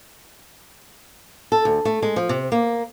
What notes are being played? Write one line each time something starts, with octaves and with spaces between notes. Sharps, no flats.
A4
D2
A3
G#3
F3
C3
A#3